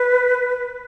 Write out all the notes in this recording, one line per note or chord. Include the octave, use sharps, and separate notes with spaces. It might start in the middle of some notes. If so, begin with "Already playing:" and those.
Already playing: B4